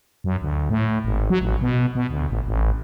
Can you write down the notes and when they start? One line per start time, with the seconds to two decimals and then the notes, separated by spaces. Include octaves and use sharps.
0.24 F#2
0.42 D2
0.70 A2
1.05 G#1
1.30 F#3
1.42 A1
1.61 B2
1.95 B2
2.10 D2
2.30 A1
2.47 A1